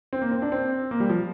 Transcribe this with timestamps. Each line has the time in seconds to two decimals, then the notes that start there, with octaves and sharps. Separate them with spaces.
0.13 C4
0.22 A#3
0.31 C4
0.42 D4
0.52 C4
0.91 A#3
1.00 G3
1.09 F3